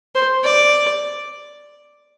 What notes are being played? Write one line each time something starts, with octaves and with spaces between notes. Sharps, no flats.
C5
D5